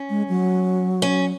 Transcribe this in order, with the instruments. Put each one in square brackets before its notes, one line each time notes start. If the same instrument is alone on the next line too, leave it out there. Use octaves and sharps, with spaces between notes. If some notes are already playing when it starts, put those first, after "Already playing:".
Already playing: [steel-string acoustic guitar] C#4
[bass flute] G#3
F#3
[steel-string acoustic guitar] C#4